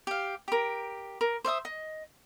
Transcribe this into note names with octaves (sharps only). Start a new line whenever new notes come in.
G4 F5
G4 A#4
A#4
C5 D5 E5 D#6
D#5